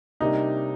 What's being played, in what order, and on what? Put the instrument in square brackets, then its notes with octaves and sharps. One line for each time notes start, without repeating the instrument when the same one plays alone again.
[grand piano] C3 G3 A#3 D4 [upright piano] D#4